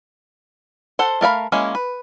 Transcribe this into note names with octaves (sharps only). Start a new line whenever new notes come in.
A4 C5 F#5
A3 A#4 F5 B5
G#3 A#3 C#4 E4
B4